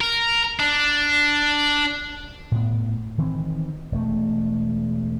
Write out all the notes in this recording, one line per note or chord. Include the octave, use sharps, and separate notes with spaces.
A#4
D4
A2 B3
D#3 E3 C4
E1 A3